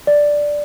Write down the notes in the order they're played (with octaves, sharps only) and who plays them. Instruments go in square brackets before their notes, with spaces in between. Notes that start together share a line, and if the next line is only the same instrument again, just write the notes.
[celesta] D5